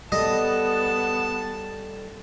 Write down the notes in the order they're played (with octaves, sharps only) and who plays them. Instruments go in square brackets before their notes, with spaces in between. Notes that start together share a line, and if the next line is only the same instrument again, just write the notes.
[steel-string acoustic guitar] G3 A4 [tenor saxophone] B3 [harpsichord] D#5 [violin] A5